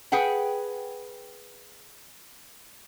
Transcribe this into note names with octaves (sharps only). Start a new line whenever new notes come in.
G#4 B4 F#5 G5